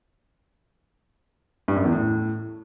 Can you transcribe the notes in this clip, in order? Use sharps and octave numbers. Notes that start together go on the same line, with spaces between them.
G2
F#2
E2
A2